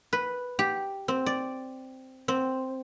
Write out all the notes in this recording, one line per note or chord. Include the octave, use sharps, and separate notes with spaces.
B4
G4
C4
D5
C4